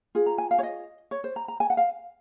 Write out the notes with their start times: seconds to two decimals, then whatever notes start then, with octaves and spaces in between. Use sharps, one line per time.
0.15 F4 G#4
0.26 A#5
0.38 G#5
0.51 F5
0.58 C#5
0.63 D#5
1.11 C#5
1.24 C5
1.36 A#5
1.48 A#5
1.60 G#5
1.70 F#5
1.77 F5